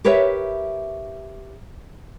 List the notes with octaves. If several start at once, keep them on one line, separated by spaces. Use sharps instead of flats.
G4 A#4 B4 C#5 E5